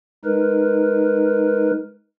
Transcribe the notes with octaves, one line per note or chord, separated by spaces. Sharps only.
G#3 D#4 A#4 B4